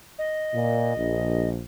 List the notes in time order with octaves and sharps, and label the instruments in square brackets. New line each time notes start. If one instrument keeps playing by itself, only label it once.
[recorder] D#5
[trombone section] A#2
A#1